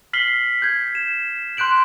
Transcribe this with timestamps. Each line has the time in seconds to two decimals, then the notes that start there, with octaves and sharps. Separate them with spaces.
0.13 F6 B6 C7 F#7 G7
0.62 G6 G#6
0.95 E7
1.57 C6 F#6 G6 D7 F#7